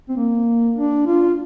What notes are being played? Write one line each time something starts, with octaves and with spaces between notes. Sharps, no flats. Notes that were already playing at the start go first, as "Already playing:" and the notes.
C4
A#3
D4
F4